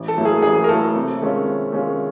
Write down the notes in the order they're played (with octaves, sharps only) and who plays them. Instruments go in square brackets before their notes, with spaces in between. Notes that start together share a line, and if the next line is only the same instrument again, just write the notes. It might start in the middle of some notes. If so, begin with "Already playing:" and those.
Already playing: [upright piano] A1
[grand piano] A4
[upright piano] A2 F#3 A#3
[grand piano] G#4
[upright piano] A1 [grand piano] G#4
[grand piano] A#4
[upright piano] A2 F#3 A#3 [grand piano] A4
[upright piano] C3
D#3 G#3 C#4 F4
C3
D#3 G#3 C#4 F4